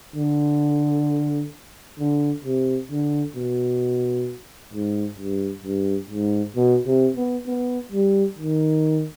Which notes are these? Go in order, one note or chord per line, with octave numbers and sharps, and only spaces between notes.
D3
D3
C3
D3
B2
G#2
G2
G2
G#2
B2
C3
B3
B3
G3
D#3